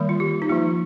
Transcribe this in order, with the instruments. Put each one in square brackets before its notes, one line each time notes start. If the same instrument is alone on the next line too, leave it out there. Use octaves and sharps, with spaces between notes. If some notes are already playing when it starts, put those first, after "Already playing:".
Already playing: [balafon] D#3 G3 A#3
F4
G4
D#4
F3 A#3 F4